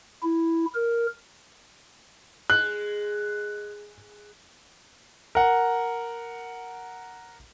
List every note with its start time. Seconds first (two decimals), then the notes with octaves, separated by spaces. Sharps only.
0.23 E4
0.74 A#4
2.50 G#3 F#6
5.35 A#4 F#5